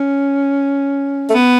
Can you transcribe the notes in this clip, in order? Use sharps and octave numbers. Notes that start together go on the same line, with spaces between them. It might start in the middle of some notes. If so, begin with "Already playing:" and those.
Already playing: C#4
A3
B3